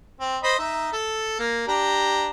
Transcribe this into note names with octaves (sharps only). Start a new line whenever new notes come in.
C4
C5 D#5 B5
D#4 E5
A4
A#3
D4 G4 A#5